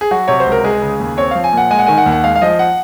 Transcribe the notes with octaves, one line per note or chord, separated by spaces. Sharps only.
G#4
F#3 F#4
C3 C#5
C5
C#2
A#4
G#3 G#4
C#3
D#2
C4 C#5
F3 F5
G#5
A#2 F#5
G#3 G#5
F#5
D#3 G#5
F#5
D#2
F#5
G#3 F5
F5
F3 D#5
F#5